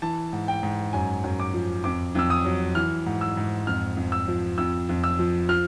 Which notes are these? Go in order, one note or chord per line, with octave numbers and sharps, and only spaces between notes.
E3 A5
G#2
G5
G#2
F#2 G#5
F#2
D6
F3
F2 D6
F2 E6
D#6
F#3
E3 F6
G#2
E6
G#2
F2 F6
F2
E6
F3
F2 E6
F2
E6
F3
F3 F6